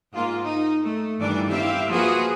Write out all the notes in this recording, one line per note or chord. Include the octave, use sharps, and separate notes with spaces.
G#2 A#3 F4
D#4
A3
G2 D#3 E3 G3 D4 D5
C4 E4 G4 E5 F5
F3 A#3 F#4 G#4 B4